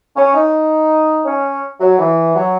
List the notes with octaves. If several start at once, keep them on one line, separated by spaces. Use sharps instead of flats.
C#4
D#4
C#4
F#3
E3
F#3